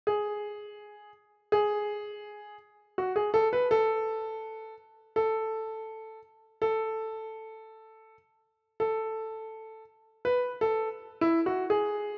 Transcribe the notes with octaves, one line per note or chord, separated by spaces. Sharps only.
G#4
G#4
F#4
G#4
A4
B4
A4
A4
A4
A4
B4
A4
E4
F#4
G#4